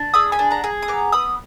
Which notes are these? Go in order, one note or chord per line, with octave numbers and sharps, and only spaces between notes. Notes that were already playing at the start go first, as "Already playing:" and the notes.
Already playing: D4
G#4 B5 D#6
G#5 B5
D4
F#5 A#5
G#4
D#6
B3 A#5 D6
B3 B5 D#6